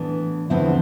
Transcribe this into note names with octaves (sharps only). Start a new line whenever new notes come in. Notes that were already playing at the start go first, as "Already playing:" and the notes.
Already playing: A2 E3 B3 D4
E2 D3 F3 B3 C4 E4